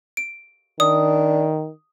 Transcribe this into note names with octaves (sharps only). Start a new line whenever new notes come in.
D7
D#3 D4 D#6